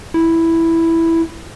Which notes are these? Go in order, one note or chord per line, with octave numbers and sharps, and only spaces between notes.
E4